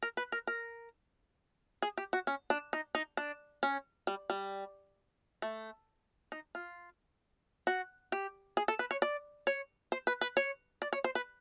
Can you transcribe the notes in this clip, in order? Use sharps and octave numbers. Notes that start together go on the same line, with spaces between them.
A#4
B4
A#4
A#4
G#4
G4
F#4
C#4
D4
D#4
D#4
D4
C#4
G3
G3
A3
D#4
F4
F#4
G4
G#4
A4
B4
C#5
D5
C#5
C5
B4
B4
C#5
D5
C#5
C5
B4